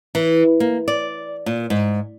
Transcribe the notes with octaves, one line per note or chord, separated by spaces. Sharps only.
E3
A#3
D5
A#2
G#2